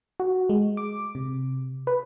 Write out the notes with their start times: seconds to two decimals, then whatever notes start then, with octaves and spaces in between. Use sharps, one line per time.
0.20 F#4
0.49 G#3
0.77 D6
1.15 C3
1.87 B4